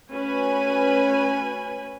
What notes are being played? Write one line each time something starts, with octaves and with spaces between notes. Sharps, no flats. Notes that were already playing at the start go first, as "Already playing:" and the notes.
A3 C#4 F#4 B4 G#5 B5